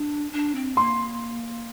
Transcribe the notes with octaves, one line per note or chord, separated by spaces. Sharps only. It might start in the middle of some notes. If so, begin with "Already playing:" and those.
Already playing: D4
D4
C4
A#3 C6